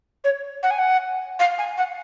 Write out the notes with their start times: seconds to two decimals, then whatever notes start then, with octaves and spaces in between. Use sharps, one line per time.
0.24 C#5
0.63 F#5
0.71 G#5
0.79 F#5
1.40 F5
1.58 G#5
1.78 F#5